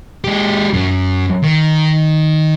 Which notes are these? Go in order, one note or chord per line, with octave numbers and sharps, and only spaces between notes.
G#3 G4
F#2
D#3